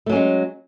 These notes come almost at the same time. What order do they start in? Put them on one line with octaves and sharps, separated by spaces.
A3 F#3 C#4 G#3